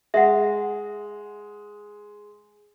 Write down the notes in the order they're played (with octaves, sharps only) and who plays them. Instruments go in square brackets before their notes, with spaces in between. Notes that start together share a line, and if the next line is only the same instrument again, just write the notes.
[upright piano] G#3 [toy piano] E5 F#5